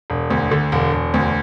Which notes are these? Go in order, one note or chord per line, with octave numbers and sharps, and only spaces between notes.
E1
D2
D3
E1
E1
D2